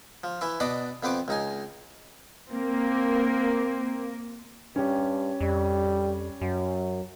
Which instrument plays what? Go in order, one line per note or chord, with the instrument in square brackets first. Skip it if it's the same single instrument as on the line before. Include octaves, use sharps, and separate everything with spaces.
[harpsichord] F3
E3 E4 E5
B2 B3 D4 D#5 B5 D6
F2 B3 C4 B4 D6
C#2 D#4 G#5
[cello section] A#3 [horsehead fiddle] C4
[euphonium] G2 [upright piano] C#4 G4
[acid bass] F2 [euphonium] G3
[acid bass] F#2 [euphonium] F#3